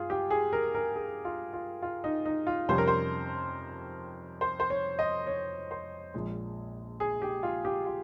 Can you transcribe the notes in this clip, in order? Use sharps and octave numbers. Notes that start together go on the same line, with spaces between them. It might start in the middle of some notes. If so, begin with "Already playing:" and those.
Already playing: G2 F4 G#4
G4
G#4
A#4
A#4
G#4
F4
F4
F4
D#4
D#4
F4
F2 C3 G3 C#4 C5
A#4
C5
C5
C5
C#5
D#5
C#5
C5
A#1 A#2 G#3
G#4
G4
F4
G4
F4